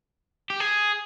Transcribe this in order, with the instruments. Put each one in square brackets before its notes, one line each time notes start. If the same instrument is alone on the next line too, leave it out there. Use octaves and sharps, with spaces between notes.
[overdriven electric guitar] G4
G#4